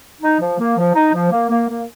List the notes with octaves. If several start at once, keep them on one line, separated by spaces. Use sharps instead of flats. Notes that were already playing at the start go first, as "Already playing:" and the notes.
D#4
F3
A#3
F3
D#4
F3
A#3
A#3
A#3